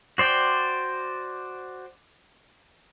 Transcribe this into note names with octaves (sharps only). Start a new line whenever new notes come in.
F#4 C5 D5 G5